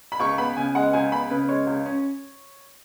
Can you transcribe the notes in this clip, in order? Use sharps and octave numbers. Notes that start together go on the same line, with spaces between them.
B5
C#2 C#6
B3 B5
C#3 G#5
G#3 F#5
C#2 G#5
B3 B5
C#3 B4
G#3 C#5
C#2
C#4